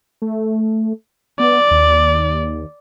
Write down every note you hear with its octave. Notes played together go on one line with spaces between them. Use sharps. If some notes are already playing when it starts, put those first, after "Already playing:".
A3
B3 D5
D#2